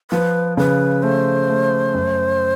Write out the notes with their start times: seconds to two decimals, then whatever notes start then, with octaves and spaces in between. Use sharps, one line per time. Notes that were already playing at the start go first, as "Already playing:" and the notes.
0.11 F3 B4
0.57 C#3 B4
1.02 A3 C5
1.49 A3
1.94 F#2